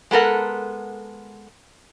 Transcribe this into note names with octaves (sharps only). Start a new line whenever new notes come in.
G#3 B3 A4 A#4 F#5